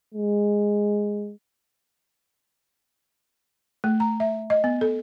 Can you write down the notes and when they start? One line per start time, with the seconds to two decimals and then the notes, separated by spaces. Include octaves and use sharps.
0.14 G#3
3.84 A3
4.00 A#5
4.20 E5
4.50 D#5
4.64 B3
4.81 A4